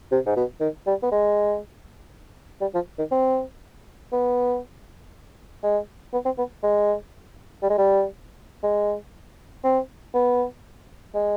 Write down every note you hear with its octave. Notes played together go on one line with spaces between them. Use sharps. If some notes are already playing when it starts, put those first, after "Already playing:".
C3
G#2
B2
D#3
G3
B3
G#3
G3
F3
D#3
C4
B3
G#3
B3
C4
B3
G#3
G3
G#3
G3
G#3
C4
B3
G#3